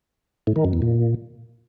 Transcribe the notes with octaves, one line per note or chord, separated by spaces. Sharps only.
A2
D#3
F#2
E2
A#2